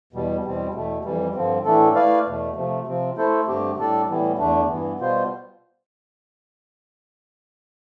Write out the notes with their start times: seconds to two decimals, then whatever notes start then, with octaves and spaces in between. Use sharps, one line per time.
0.13 E2 B2 G3
0.43 E2 B2 G3 C4
0.73 E2 B2 A3
1.04 F2 E3 G3
1.35 G2 D3 F3 C4
1.65 A2 E3 A3 D4 A4
1.95 A3 E4 B4 D5 F5
2.26 E2 B2 A3
2.56 C3 F3 A3
2.86 C3 F3 C4
3.17 A3 E4 A4 C5
3.47 G2 D3 A3 C4 G4
3.78 A2 G3 D4 A4 D5
4.08 A2 E3 G3 B3
4.38 E2 D3 A3 D4
4.69 G2 E3 B3
4.99 B2 G3 B3 F4 C5